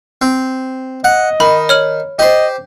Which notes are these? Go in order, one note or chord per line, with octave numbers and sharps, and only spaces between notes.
C4
D#5 F#5
D#3 B5
C#5 F6 F#7
G4 C5 D#5